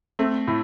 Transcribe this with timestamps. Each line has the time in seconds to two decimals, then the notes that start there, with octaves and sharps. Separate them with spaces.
0.19 A3 C4
0.47 A2